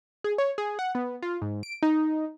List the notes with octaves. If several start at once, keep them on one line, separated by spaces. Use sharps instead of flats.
G#4
C#5
G#4
F#5
B3
F4
G#2
D7
D#4